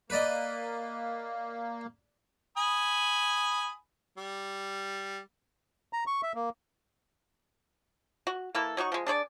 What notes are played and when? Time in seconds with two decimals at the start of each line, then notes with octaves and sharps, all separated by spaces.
0.10 A#3 B4 D5 D#5
2.57 G#5 B5 D#6
4.18 G3
5.93 A#5
6.07 C#6
6.22 E5
6.35 A#3
8.27 F#4
8.55 E3 A#3 E4 A4
8.77 F#3 D#4 F#4 C#6
8.92 F3 G#3
9.07 D4 G#4 C#5 D5